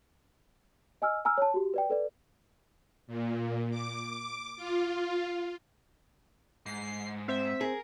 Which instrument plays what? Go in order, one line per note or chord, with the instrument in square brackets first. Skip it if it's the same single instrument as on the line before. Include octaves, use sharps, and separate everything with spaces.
[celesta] D#5 G#5 E6 F6
G#5 A#5 E6 F6
C#5 A5
F#4 G4
B4 D5 G5
A4 B4 D5
[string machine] A#2
D6
F4
[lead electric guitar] G#2 [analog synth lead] C7
[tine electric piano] C4 C5 [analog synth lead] E5
[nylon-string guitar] G#4 [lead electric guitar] A#4